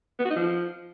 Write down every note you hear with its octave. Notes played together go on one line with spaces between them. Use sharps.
B3
F#4
D#4
F3